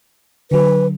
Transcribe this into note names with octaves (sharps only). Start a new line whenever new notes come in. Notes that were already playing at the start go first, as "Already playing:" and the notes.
D3 F#3 B4